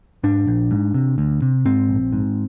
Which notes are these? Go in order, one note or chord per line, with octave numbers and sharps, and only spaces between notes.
G#2 D4
A#1
G#2
C3
D2
C3
G#2 C4
A#1
G#2